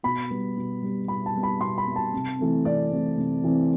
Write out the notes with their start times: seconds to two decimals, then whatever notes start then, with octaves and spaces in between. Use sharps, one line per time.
0.03 B2 B5
0.30 G3 B3
0.56 B2
0.83 G3 B3
1.08 B2 B5
1.26 A5
1.35 G3 B3
1.43 B5
1.61 B2 C6
1.78 B5
1.87 G3 B3
1.96 A5
2.13 C3
2.39 E3 A3 C4
2.65 C3 D5
2.91 E3 A3 C4
3.18 C3
3.44 E3 A3 C4